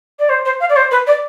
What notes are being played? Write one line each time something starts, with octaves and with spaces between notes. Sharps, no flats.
D5
C5
C5
F5
D5
C5
B4
D5